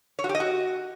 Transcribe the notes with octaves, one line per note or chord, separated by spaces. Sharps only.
C#5
F#4
G4
D#5
F#4